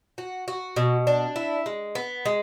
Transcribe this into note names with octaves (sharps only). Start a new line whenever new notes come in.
F#4
F#4
B2
D4
E4
G#3
B3
G#3